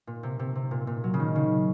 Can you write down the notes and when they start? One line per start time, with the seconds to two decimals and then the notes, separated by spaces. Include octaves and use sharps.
0.07 A#2
0.23 C3
0.39 C3
0.55 C3
0.71 A#2
0.87 A#2
1.04 F#3
1.14 C#3
1.20 D#3
1.36 C#3